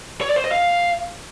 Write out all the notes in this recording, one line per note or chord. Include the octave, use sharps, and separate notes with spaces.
C#5
D5
C5
D#5
F5